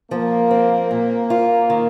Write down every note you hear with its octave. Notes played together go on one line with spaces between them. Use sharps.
F3 A#3
C4
A#2
F4
D#3